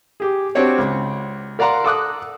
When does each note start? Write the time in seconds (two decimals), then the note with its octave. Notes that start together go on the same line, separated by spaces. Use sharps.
0.20 G4 G#4
0.55 C4 D4 F#4 G4 C#5 D5
0.78 C#2
1.59 A#4 D5 F5 F#5 A#5 C6
1.84 A4 D6 D#6 F#6